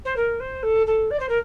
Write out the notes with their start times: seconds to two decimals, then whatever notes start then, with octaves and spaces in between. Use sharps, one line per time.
0.04 C5
0.16 A#4
0.40 C5
0.62 A4
0.86 A4
1.10 D5
1.19 C5
1.28 A#4